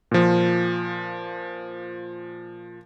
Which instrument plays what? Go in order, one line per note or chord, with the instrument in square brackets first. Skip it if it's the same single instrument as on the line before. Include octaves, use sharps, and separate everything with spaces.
[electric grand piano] A#2 F3